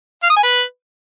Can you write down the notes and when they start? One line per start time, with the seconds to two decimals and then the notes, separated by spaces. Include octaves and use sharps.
0.23 F5
0.29 D#6
0.36 G#5
0.43 B4